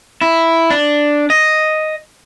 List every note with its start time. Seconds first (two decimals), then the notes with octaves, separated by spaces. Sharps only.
0.21 E4
0.70 D4
1.30 D#5